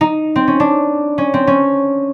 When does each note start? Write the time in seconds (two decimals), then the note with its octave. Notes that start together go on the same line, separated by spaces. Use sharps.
0.01 D#4
0.36 C4
0.48 C#4
0.60 D4
1.18 C#4
1.34 C4
1.47 C#4